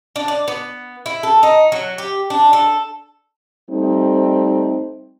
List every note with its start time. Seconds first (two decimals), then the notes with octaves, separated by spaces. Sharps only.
0.16 D4
0.28 D5
0.48 B3
1.06 E4
1.23 A4
1.43 D#4
1.72 F#3
1.98 G4
2.30 D4
2.53 A4
3.70 G3 A3 C4 D#4